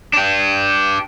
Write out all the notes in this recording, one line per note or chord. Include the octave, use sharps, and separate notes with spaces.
D4 G4